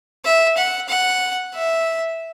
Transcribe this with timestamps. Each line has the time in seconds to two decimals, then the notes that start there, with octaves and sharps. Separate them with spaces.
0.25 E5
0.57 F#5
0.89 F#5
1.54 E5